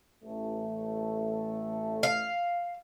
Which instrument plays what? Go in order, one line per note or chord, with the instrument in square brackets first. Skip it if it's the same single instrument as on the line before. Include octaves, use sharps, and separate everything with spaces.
[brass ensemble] A1 A3
[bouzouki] F5